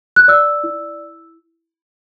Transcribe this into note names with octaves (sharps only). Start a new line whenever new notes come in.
F#6
D5 E6
E4